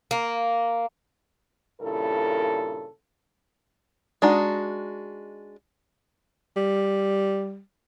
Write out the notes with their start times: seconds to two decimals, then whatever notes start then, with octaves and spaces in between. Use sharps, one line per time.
0.11 A#3
1.81 G2 A#2 C#3 E4 A4 A#4
4.22 G#3 D4 D#4 F#4
6.56 G3